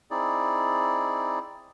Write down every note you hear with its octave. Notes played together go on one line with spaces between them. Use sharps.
C4 D#4 E4 G#4 D5